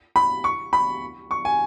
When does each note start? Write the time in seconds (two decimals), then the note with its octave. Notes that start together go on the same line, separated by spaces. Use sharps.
0.16 B5
0.44 C#6
0.73 B5
1.31 C#6
1.45 G#5